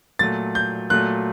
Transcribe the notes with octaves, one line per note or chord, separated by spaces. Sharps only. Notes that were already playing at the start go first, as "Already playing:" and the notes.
A#2 F#3 A3 A6
G6
A#2 F#3 A3 F#6